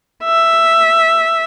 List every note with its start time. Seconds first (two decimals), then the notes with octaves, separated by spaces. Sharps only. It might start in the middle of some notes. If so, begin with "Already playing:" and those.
0.24 E5